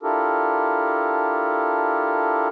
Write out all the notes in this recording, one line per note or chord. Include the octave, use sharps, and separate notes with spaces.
D4 E4 F4 G4 A4 A#4